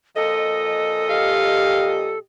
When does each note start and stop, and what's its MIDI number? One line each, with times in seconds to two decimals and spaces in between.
0.16 2.14 46
0.16 2.14 53
0.16 2.18 69
0.16 2.14 75
1.10 2.17 67
1.10 1.99 77